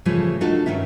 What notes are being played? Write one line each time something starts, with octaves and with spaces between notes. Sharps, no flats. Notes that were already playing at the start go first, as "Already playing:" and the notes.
G#2 C#3 E3 F3 G3 A3
A3 D4 D#4 F4 F#4 A4
G2 C3 D#3 C#4 E5